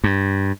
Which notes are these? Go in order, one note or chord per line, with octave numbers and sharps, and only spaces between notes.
G2